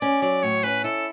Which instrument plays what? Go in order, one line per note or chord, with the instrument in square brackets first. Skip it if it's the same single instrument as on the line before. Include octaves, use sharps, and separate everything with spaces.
[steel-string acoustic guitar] C#4 [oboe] D5
[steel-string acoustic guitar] F#3 [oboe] D5
[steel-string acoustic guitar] A2 [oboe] C#5
[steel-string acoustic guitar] C#4 [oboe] B4
[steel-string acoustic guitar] E4 [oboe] A4